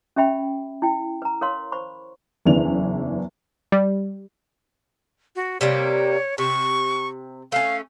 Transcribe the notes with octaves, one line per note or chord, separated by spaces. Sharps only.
C#4 G4 E5 G5 B5
E4 G5
B4 A#5
A#4 B4 C#5 F5 C6
C5 B5 C#6
F#1 E2 E3 D4 F7
G3
F#4
C3 G3 A#3 C#5
C3 C#6
A3 C#4 F5